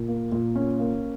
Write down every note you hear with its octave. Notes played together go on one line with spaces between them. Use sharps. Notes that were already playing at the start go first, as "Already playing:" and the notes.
Already playing: A#2
A#3
A#2
C#4
A#3